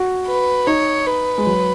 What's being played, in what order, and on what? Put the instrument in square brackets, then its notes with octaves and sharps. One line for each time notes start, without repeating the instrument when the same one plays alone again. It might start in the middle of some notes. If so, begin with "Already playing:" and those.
Already playing: [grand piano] F#4
[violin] B4
[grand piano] D#4 [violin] C#5
[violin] B4
[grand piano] G#3
F#3